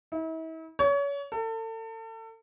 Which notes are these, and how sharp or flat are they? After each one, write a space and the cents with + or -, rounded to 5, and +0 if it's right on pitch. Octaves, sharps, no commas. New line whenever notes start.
E4 -40
C#5 +30
A4 +35